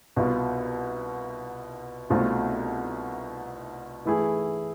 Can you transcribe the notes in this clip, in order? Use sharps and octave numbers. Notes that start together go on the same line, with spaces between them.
C2 B2 B3 F4
C2 B2 A3 C4 F4
E3 A3 E4 G#4